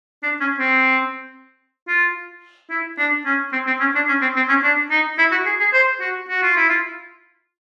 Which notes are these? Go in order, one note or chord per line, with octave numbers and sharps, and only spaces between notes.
D4
C#4
C4
F4
E4
D4
C#4
C4
C4
C#4
D4
C#4
C4
C4
C#4
D4
D#4
E4
F#4
G#4
G#4
C5
F#4
F#4
F4
E4
F4